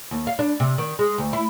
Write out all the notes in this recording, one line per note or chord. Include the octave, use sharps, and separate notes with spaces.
D#2
F5
D4
C3
D#3
G#3
D2
E4